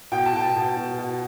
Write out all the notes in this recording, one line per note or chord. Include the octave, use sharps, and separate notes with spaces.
B2 G5
A5
B2 G5
A5
B2
B2
B2